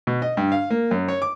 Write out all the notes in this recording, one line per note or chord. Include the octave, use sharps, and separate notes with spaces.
B2
D#5
G2
F5
A#3
F#2
C#5
D6